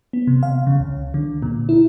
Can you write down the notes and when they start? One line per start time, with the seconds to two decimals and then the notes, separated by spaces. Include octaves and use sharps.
0.13 B3
0.27 C3
0.43 F5
0.67 C#3
0.80 C#2
1.14 D3
1.42 A#2
1.69 E4